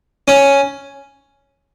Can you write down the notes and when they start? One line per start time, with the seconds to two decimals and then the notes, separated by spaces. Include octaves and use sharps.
0.28 C#4